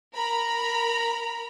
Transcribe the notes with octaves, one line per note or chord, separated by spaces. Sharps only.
A#4 A#5 B5